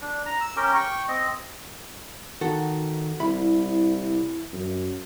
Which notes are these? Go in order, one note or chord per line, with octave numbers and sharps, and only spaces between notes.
D4
A#5
E6
C#4 G4 A#4 G5
G5 C#6
C4 D#5
D#3 F#4 A4
C2 E4 B5
F#2